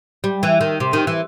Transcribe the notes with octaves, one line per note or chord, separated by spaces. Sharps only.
G3
E3
D#3
C3
D#3
E3